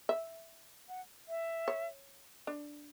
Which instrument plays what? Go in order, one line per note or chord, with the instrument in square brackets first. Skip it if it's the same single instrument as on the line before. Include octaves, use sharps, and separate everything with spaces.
[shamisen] E5
[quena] F#5
E5
[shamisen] C#5
D4